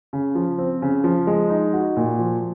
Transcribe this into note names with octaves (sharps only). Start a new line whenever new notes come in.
C#3
F3
C4
C#3
F3
G#3
D#4
F#4
A#2
F3